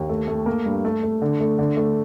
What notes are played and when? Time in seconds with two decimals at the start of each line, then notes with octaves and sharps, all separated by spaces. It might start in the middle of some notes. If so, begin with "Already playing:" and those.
Already playing: D#2
0.09 A3
0.28 A3
0.46 A#3
0.66 G2
0.85 A3
1.03 A3
1.22 D3
1.41 A3
1.59 D3
1.77 A3